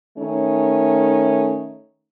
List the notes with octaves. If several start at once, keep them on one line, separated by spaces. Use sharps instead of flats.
D#3 A3 C#4 D#4